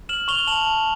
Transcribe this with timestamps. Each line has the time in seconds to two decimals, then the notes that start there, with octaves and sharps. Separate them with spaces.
0.09 F6 E7 F#7
0.28 C#6 F7 G7
0.47 A5 E7 F#7
0.66 A5